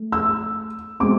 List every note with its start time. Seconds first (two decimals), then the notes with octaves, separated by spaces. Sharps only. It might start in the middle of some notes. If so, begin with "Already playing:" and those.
Already playing: A3
0.12 E6
1.00 B2 G#3 C4 D6